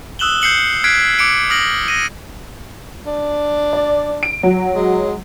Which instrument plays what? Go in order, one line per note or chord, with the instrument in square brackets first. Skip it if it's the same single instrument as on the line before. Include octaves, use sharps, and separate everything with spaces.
[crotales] D#6 E6 F#6 E7 F#7 G7
G6 C7 C#7 F#7
F6 F#6 G#6 B6 C7 D7
D6 C#7 D7
D#6 F6 A#6 D7 F#7 G7
A#6 D#7
[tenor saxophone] D4
[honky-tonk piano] D5
D7
F#3
[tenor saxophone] G#3